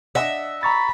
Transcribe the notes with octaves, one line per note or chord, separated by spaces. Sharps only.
D4 D#5 E5 F#5
A#5 B5 C#6 A6